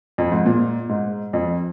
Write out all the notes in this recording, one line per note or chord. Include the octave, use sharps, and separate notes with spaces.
F2
G#2
A#2
G#2
F2